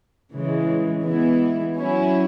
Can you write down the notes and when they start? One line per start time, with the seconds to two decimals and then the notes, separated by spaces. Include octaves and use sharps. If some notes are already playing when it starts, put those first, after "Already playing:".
0.32 C#3 E3 G#3
1.03 E3 G#3 B3 E4
1.76 F#3 C#4 E4